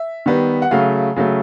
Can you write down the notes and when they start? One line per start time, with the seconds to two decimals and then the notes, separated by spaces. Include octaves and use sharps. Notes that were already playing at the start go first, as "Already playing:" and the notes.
Already playing: E5
0.26 D#3 G3 B3
0.62 F#5
0.71 C#3 F#3 A3 F5
1.16 C#3 F#3 A3